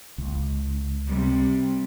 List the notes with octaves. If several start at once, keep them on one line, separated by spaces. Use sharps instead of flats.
C#2
C3 G3